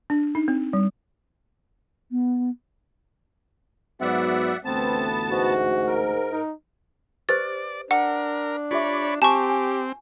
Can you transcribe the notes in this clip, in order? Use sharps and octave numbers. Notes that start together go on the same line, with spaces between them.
D4
D#4
C4
G3
B3
G#2 F#3 B3 F#4 D5 E5 F#5
A1 D2 A3 B3 C4 A5
G#2 F#4
A#4
D#4
G4 B4 C5 D5 A6
D4 A#4 F#5
F4 G4 C#5 D5 E5 B5
C4 G4 G#5 A5 C#6
G#5